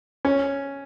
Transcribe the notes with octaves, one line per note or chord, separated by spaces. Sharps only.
C#4